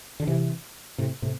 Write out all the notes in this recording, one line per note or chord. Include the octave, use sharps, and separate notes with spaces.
D3
C3 E3
A2 C3
A2 C3